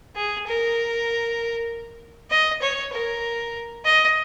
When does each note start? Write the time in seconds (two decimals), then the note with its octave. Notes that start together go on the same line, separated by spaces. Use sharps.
0.16 G#4
0.47 A#4
2.30 D#5
2.62 C#5
2.92 A#4
3.85 D#5